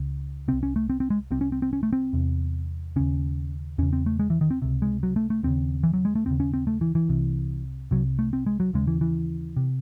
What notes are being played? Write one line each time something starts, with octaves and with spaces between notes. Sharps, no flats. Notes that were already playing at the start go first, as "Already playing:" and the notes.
Already playing: C#2 C#3
C2 C3 C4
C#4
A3
C4
C4
G#3
C2 C3 C4
C#4
C4
C4
C#4
A3
C4
E2 C3
D#2 C#3 C#4
E2 C#3 C#4
C4
A3
G#3
E3
D#3
C4
C#2 C3
G#3
F#3
A3
A3
D#2 C#3 C4
E3
F#3
G#3
A3
D#2 C#3 C4
C#4
C4
A3
E3
E3
C2 C3
C2 C3 F#3
A3
C4
G#3
F#3
D#2 C#3 G#3
E3
E3
C3